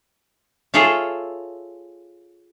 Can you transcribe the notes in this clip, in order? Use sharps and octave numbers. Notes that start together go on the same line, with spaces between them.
F4 G#4 A4 C#5 E5 F5